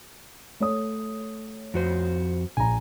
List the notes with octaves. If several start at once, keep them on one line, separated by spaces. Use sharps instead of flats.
A3 C#5 D#6
F2 F#4 C5
A#1 G#5 A#5